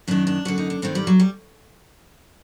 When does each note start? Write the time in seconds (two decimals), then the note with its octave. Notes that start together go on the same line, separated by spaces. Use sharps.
0.08 F#2 D#3 D4
0.27 D4
0.45 F#2 D3 F#4
0.58 D#4
0.70 D4
0.82 G2 D#3 C4
0.95 G3
1.07 F#3
1.20 G3